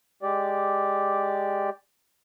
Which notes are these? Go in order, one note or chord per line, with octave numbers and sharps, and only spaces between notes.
G#3 G4 D5